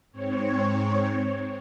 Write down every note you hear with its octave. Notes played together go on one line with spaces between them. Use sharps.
G#2 C4 C#5